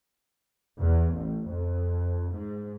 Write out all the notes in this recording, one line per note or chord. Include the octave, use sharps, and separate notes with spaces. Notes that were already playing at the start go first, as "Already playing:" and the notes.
E2
A1
F2
G#2